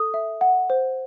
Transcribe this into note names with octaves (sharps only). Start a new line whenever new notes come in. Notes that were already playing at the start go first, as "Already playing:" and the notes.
Already playing: A4 D#6
E5
F#5
C5